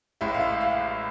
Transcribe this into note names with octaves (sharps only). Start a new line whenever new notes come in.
A1 A2 G#3 E5
F5
E5
F5